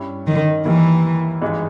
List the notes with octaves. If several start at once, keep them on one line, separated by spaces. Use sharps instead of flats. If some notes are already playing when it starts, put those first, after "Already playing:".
Already playing: G2 G3 C#4 E4
D#3
D#2 D#3 E3 G3 A#3 E4
G#1 G2 E3 G#3 D#4